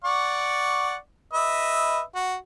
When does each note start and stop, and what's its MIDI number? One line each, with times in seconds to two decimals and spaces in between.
0.04 0.96 74
0.04 0.96 78
0.04 0.96 85
1.34 2.01 71
1.34 2.01 75
1.34 2.01 76
2.15 2.36 66